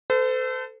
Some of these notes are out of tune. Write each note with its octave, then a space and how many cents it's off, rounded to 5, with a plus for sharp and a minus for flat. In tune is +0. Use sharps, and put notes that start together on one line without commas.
A4 +10 C5 -40